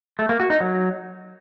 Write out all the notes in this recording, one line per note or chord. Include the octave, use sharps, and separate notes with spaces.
A3
A#3
F#4
D#4
F#3